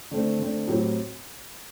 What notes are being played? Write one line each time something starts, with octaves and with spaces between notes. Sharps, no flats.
D3 A3 C4
D3 A3 C4
A2 F#3 C4 G4